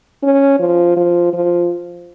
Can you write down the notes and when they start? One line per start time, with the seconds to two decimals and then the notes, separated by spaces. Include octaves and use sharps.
0.23 C#4
0.59 F3
0.96 F3
1.33 F3